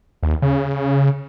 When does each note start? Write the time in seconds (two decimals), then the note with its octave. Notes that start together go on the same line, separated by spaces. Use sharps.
0.23 D#2
0.42 C#3